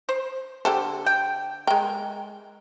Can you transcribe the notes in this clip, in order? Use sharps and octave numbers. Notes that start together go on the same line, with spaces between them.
C5
D3 G4 A4 C5
G5
G#3 A#4 G5